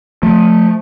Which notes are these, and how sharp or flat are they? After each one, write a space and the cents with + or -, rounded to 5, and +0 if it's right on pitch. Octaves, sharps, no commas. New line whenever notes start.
F3 +25 A3 +0